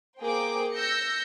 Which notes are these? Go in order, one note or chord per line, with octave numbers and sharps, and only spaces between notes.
A#3 G#4 C5 G5 D6
E6 G6 A#6 C#7